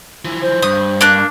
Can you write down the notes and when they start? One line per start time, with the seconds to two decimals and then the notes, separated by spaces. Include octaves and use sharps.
0.25 E3 F3
0.42 C5
0.62 G2 D#6
1.01 A#3 D4 F#6